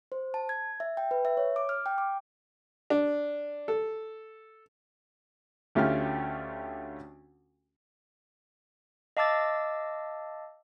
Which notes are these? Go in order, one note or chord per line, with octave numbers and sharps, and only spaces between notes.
C5
A5
G#6
E5
G5
B4
E5
C#5
D6
F6
G5
D6
D4
A4
D2 A3 C#4 F4 G4 F6
D#5 F5 A5 D6 E6 A6